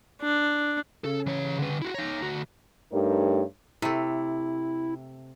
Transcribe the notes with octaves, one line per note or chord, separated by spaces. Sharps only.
D4
C#3 A4
E3 C#5
D3 B4
E4 F#4
D#4 C#5 A#5
D2 F#4
G2 A3 D#4 G4 A#4 C#5
C3 A3 E4